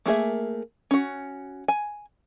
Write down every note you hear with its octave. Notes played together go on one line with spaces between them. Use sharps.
A3 A#3 G#4 E5
C#4 F#4
G#5